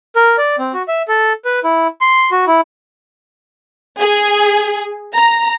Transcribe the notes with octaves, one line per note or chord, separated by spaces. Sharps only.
A#4
D5
C4
F#4
E5
A4
B4
E4
C6
F#4
E4
G#4
A#5